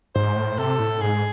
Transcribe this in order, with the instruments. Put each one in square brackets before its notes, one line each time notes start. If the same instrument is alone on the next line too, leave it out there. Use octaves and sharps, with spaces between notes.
[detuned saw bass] G#2 [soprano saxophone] C5
[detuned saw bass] A2
[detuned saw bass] C3 [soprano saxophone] A4
[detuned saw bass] A2
[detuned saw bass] G#2 [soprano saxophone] G#4